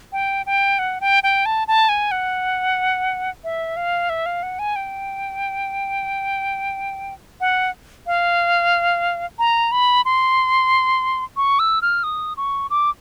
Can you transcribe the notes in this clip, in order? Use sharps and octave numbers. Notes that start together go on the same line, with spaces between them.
G5
G5
F#5
G5
G5
A5
A5
G#5
F#5
E5
F5
E5
F5
F#5
G#5
G5
F#5
F5
A#5
B5
C6
C#6
E6
F6
D#6
C#6
D6